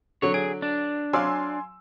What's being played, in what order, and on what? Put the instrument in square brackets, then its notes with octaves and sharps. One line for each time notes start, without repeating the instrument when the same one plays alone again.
[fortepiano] D3 F#3 [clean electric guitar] C#5
[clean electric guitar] G#4 [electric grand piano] D7
[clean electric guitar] D4
[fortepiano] F#3 D5 F5 [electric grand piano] G#5 C6 E6